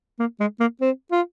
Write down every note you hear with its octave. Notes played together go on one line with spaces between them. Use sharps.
A#3
G#3
A#3
C4
F4